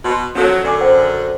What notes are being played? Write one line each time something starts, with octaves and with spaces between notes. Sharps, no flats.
B2 F#4 C6
D#3 F3 F#3 C#4 A4 A#4
F#2 D3 D5 G#5 D6
C5 F#5 G5